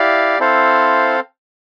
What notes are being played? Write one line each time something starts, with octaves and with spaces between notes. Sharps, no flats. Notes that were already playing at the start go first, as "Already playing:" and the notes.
Already playing: E4 G4 D5 F5
C4 E4 A4 C5 F5